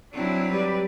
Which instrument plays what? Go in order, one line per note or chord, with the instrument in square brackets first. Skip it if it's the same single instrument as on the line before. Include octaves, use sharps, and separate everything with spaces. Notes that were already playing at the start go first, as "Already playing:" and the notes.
[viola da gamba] F#3 C4 [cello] D4 E4
[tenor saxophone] G3 [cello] B4 D5